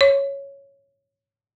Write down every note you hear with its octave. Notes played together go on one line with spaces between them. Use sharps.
C#5